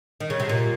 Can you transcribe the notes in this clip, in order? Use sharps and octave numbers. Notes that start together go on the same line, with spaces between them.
D#3
C#3
C3
A#2